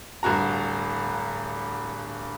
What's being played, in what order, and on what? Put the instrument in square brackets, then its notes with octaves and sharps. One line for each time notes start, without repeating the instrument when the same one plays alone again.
[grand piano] D1 G2 F#4 A#5